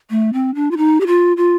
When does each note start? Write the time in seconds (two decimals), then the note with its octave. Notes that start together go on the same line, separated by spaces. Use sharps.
0.10 A3
0.33 C4
0.55 D4
0.71 F4
0.77 D#4
1.00 G4
1.07 F4
1.37 F4